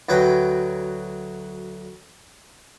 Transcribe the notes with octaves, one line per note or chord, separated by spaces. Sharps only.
D2 F#3 B4 G5